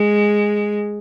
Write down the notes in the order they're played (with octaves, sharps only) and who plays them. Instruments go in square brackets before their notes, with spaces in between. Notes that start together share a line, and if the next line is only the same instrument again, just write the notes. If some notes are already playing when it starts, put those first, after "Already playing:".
Already playing: [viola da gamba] G#3